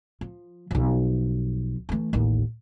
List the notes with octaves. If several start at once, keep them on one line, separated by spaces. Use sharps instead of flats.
F3
B1 F3
E3 A3
A1 D#2